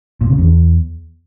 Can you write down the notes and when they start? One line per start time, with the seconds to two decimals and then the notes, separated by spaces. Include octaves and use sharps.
0.21 A#2
0.30 C#3
0.38 E2